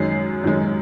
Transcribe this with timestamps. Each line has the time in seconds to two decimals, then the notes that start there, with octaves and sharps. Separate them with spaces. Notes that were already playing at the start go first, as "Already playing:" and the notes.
Already playing: F#2 D#3 G#3 C#4 C7
0.44 F#2 D#3 G#3 C#4